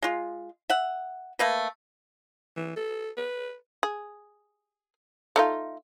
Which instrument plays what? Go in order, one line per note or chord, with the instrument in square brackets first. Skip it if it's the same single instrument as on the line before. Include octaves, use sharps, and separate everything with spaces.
[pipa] G#3 F4
E5 F#5
A3 A#3 B4
[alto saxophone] E3
A4
B4
[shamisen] G#4
A3 D#4 F4